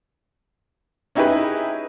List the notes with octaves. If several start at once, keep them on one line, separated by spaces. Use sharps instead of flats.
C#4 D#4 E4 G4 G#4 B4